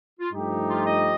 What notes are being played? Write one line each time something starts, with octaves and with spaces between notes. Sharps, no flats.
F4
G2 F3 A3 D#4 G4
F4
D#5